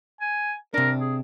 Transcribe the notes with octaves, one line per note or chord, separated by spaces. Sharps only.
G#5
C3 D4 A#4
G#4